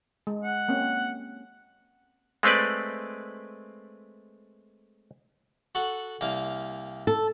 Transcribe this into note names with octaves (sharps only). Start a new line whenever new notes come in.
G#3
F#5
A#3 C4 C#4
G#3 A3 C4 B4 D5
F#4 A4 F#5
C2 A#3 F5
A4